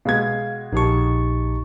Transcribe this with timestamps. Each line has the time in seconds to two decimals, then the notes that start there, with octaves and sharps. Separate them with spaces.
0.05 B2 G#3 F5 G#6
0.73 A#1 D#4 G4 A5 C#6